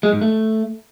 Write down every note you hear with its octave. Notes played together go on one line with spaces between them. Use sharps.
G#3
G#2
A3